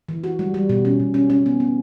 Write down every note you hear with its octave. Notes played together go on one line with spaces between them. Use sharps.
E3
F#4
G3
G3
B2
C#4
B2
C#4
C#4
B3
B3